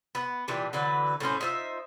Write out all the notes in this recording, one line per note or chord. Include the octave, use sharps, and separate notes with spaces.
B3
A#2 E3 D4 G4
D3 E3 F#3 B4
A2 F#3 C#4 C5
D#4 F4 C5 E5